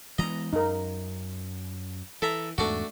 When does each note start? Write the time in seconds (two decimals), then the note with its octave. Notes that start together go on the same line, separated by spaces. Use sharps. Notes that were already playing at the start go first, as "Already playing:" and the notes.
0.19 E3 G#3 B3 D#5 A#5
0.53 F#2 D#4 A#4
2.22 E3 A4 E5 A#5
2.58 E2 G#2 A3 D4 F#4